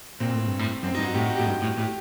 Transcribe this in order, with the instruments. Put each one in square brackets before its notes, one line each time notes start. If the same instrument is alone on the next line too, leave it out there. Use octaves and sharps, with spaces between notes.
[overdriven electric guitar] A#2 [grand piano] C4
[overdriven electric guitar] A2
G2
A2
[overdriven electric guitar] F#2 [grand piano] C4
[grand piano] D#4
[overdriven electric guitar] G2
[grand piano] F#4
[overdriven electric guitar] A2 [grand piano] G4
[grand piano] F#4
[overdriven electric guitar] A2 [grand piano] G4
[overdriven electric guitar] G2
A2
[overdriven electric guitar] A2 [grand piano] G4